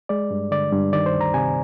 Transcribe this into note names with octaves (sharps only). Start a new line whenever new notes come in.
G#3 D5
G2
D3 D5
G2
D#3 D5
C5
D2
A#5
C3 G#5